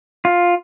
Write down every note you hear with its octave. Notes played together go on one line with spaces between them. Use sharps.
F4